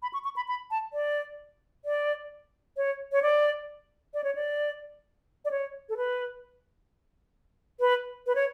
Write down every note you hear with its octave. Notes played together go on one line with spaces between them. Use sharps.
B5
C#6
C#6
B5
B5
A5
D5
D5
C#5
C#5
D5
D5
C#5
D5
D5
C#5
A4
B4
B4
B4
C#5